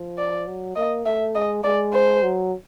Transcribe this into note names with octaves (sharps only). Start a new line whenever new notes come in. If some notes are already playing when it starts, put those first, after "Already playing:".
Already playing: F3
D5
F#3
A#3 D#5
A3 E5
G#3 D#5
G#3 D5
C5
F#3